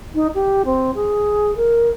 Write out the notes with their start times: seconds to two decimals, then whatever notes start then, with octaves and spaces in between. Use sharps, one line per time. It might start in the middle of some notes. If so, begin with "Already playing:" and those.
0.14 D#4
0.34 G4
0.64 C4
0.94 G#4
1.56 A#4